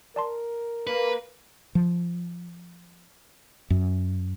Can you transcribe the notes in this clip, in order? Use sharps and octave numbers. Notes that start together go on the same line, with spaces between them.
A#4 D5 A5 C6
A#3 B4
F3
F#2